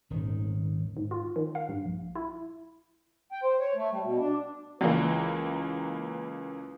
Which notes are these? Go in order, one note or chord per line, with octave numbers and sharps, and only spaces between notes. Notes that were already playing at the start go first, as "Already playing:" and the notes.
D#1 G#1 D#3
G#2
F4
D#3
F5
G2
A#1
E4
G5
C5
C#5
A3
G3
B2
D4
C#2 E3 A#3 B4